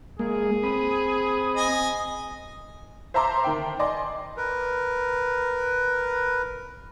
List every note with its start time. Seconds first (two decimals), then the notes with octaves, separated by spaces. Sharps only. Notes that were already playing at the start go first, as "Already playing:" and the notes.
0.19 G#3 A#3 G#4
0.63 C4 B5 D#6
1.56 D#5 G#5
3.14 C5 E5 A5 A#5 C6 D6
3.44 D#3 G5
3.79 D5 D#5 G#5 C6 D6
4.37 A#4 B4